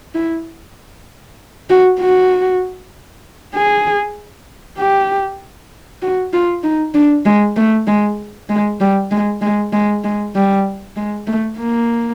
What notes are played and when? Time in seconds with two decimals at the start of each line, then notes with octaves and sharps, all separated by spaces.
0.15 E4
1.70 F#4
2.00 F#4
3.55 G#4
4.79 G4
6.02 F#4
6.33 F4
6.63 D#4
6.94 D4
7.25 G#3
7.56 A3
7.87 G#3
8.49 G#3
8.81 G3
9.11 G#3
9.41 G#3
9.73 G#3
10.04 G#3
10.35 G3
10.96 G#3
11.27 A3
11.58 A#3